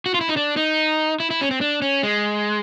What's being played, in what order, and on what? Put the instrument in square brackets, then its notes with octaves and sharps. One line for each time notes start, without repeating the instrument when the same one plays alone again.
[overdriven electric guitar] F#4
F4
E4
D#4
D4
D#4
E4
E4
C#4
C4
D4
C#4
G#3